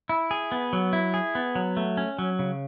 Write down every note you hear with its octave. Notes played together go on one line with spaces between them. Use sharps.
E4
G#4
B3
F#3
E4
G#4
B3
F#3
A3
C#4
F#3
C#3